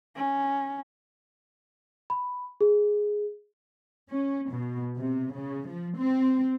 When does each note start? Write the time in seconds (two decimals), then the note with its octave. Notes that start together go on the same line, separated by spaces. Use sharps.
0.16 C#4
2.10 B5
2.61 G#4
4.09 C#4
4.51 B2
4.96 C3
5.33 C#3
5.68 F3
5.98 C4